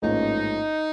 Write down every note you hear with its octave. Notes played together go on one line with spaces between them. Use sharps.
A1 G#2 F3 A#3 C#4 D#4